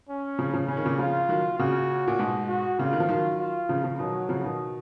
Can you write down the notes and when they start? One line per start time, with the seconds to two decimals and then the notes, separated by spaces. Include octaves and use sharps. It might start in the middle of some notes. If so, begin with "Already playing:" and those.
0.09 C#4
0.39 C#3 F3
0.53 C#3 F3
0.68 C#3 C#4
0.77 D#3
0.85 A#2 C#3
0.98 C#3 F3 F4
1.29 D#3 F#3
1.58 A#2 C#3 F#4
2.07 A#2
2.19 G#2 B2
2.48 F#4
2.79 A#2 C#3 F4
2.93 D#3
3.00 F3
3.08 D#3 F#3
3.39 F4
3.69 C#3 F3
3.84 C#3 F3
3.99 B2 D#3 F#3
4.29 C#3 F3
4.44 B2 D#3